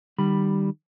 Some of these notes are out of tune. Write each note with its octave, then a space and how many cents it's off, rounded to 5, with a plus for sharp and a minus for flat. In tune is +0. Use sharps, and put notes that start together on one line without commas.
D#3 -25 G3 +0 B5 +0